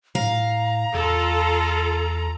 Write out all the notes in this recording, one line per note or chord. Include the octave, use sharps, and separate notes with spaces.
A2 F5 A#5
E2 F4 A4